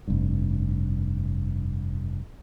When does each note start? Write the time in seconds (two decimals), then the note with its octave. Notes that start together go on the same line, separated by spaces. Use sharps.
0.08 F1 G2